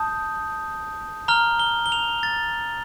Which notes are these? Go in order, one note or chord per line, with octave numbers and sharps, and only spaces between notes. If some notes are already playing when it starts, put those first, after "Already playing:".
Already playing: A5 D#6 G6
A#5 F6 G7
G7
G7
F7
A6